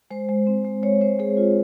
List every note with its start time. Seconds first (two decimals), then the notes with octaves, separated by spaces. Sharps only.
0.11 G#3 C5
0.29 G#3
0.47 C4
0.65 G#3
0.83 G#3 C#5
1.01 C4 C5
1.19 G#3 G#4
1.37 F4